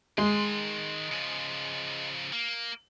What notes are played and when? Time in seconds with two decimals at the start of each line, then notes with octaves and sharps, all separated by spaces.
0.18 D#3 G#3 C6
1.11 C#3 F3
2.33 A#3